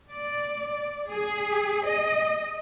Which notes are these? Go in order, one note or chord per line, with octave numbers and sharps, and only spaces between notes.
D5
G#4
D#5